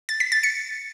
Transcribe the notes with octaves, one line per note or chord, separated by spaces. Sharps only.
A6
B6
A6
C#7